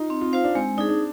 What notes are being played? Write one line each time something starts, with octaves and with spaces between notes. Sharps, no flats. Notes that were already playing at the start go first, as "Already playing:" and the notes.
Already playing: D#4 F4
C4
F4
F4 C5 F5
D4
G#3 C4
D4 D#4 G#4
D4